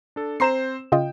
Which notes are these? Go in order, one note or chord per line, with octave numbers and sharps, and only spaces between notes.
D4 A4
C4 C5 A#5 C6 C7 E7
C#3 F4 D#5 G5